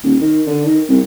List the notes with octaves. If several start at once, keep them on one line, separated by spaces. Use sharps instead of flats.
D#1
D#3
D3
D#3
C2